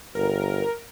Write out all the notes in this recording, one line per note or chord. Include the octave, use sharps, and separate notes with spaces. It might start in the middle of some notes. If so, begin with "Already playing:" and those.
G1 A#4